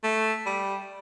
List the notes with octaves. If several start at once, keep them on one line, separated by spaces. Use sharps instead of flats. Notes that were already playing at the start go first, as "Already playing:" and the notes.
A3
G3